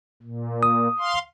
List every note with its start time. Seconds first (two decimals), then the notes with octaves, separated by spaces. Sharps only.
0.22 A#2
0.63 D#6
0.99 F5 C6